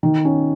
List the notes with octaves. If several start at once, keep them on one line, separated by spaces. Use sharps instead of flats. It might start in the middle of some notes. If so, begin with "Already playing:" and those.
D#3
C#4